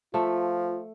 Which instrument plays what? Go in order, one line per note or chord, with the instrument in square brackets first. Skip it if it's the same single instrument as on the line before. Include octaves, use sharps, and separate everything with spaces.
[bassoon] F3 [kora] A3 E5 [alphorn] F4